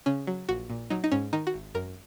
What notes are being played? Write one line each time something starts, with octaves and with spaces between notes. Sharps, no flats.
C#3 C#4
F#3
A#1 F#4
A#2
F#3 D#4
D#4
G#2 C#4
D#3 D#4
F#4
G#1
F#2 A#4